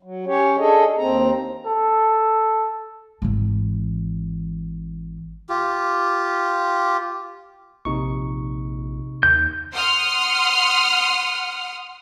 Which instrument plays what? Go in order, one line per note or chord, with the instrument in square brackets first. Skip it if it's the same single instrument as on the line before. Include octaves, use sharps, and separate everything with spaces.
[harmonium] F#3
C#4 G4 C#5
D4 G#4 A4 D#5
D#2 C4 A#5
[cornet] A4
[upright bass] G#1 E3
[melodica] F4 G4
[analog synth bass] A#1 [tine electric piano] C3 D#4 C#6
[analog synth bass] D#2 [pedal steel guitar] G6
[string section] F#5 C6 D#6 F6